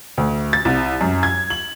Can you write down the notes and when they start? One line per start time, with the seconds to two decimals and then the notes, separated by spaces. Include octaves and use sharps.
0.17 D2
0.53 A6
0.65 C2
1.01 F#2
1.23 G#6
1.50 F#7